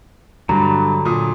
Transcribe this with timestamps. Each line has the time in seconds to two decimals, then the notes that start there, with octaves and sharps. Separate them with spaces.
0.49 G2 D3 F#3 A#5
1.05 A#2 D#6